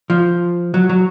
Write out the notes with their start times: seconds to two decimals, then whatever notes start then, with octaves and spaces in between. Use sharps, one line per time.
0.10 F3
0.74 F#3
0.89 F#3